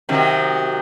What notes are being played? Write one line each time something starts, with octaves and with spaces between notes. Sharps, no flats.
C3 D#3 F#3